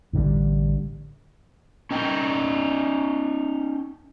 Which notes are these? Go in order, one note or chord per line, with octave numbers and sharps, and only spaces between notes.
A1 D3 D#3 G3
C#4 D#4 G5